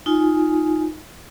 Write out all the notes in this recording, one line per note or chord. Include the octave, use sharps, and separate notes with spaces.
D#4 F4 G#5